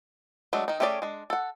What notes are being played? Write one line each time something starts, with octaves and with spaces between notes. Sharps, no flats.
F#3 G#3 A3 D4
D#3 D#4
A3 C#4 G4 G#4 D5
G#3 D4
A4 F#5